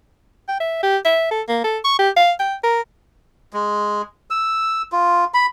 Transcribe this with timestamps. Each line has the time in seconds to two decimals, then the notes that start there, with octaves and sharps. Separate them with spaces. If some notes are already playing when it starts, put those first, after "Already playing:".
0.49 G5
0.60 E5
0.83 G4
1.05 E5
1.31 A4
1.49 A#3
1.64 A4
1.84 C#6
1.99 G4
2.17 F5
2.40 G5
2.63 A#4
3.53 G#3
4.30 E6
4.92 F4
5.34 B5